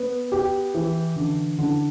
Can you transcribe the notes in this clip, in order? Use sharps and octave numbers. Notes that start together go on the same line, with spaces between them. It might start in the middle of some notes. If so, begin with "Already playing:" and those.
Already playing: B3
G4
E3
D3
D3